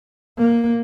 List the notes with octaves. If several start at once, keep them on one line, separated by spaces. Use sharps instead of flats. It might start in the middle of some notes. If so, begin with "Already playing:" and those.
A#3